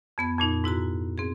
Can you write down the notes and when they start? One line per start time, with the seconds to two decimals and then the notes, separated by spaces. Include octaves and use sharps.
0.18 F2 B3 G#6
0.39 F2 A#2 D#4
0.64 G#2 E4 F#4 A#5
1.18 C4 G#4